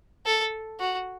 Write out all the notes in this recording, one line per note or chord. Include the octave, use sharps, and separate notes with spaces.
A4
F#4